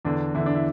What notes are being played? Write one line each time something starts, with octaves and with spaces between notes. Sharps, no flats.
E2 D3 D4
E2 D3 E4
D4
E4